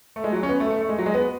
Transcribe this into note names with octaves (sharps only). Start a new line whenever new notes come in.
A3
G#3
F#3
C#4
B3
A3
A3
A3
G#3
F#3
G#3
B3